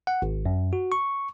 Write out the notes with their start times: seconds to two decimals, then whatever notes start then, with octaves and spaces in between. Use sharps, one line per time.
0.07 F#5
0.22 G#1
0.46 F#2
0.73 F#4
0.92 C#6